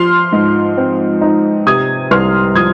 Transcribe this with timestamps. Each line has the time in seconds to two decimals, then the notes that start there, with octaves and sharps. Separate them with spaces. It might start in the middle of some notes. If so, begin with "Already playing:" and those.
Already playing: F3 C6 F6
0.33 G#2
0.77 C4
1.22 D#4
1.66 C3 D#6 G#6
2.11 C2 C6 F6
2.56 F3 D#6 G#6